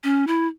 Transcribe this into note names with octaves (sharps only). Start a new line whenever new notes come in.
C#4
E4